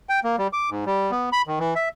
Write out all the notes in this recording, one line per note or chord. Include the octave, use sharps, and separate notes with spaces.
G5
A#3
G3
D6
G#2
G3
B3
B5
D#3
E3
E5